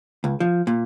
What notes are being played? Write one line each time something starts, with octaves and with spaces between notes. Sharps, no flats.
C#2
F3
A#2